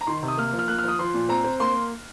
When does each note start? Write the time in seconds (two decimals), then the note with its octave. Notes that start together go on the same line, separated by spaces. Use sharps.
0.01 A#5
0.07 D#3 C6
0.23 C3
0.28 D#6
0.37 A#3 F6
0.53 F3
0.59 F6
0.68 A#3 F#6
0.79 F6
0.84 F3 D#6
0.99 F3 C6
1.14 A#2
1.29 C4 A#5
1.44 C4
1.60 A#3 C6